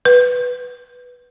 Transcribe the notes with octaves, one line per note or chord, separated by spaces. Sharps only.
B4